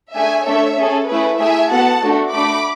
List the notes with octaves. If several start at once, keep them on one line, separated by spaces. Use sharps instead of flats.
A3 D4 G#4 E5 G#5
A3 D4 A4 C#5 E5
C#4 G#4 A4
A3 E4 G#4 B4
A3 E4 G#4 E5 G#5
B3 F#4 A4 F#5 A5
A3 D4 F#4 A4
A3 D4 F#4 B5 D6